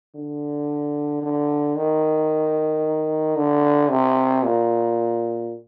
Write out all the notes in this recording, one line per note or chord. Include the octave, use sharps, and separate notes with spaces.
D3
D3
D#3
D3
C3
A#2